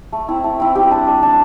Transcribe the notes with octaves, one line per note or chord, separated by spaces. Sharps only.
A3
C4 E4
A3
C4 E4
G3 G4
D4
G3
D4